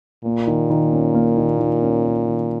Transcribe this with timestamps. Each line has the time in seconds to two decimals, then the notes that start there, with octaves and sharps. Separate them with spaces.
0.24 A#2 A#3
0.47 D#3
0.70 D#3
0.93 C#4
1.14 A#3
1.37 D#3
1.59 D#3
1.82 C#4
2.05 A#3
2.27 D#3